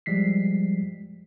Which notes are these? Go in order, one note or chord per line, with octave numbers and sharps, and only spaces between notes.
F3 G3 G#3 B6 C7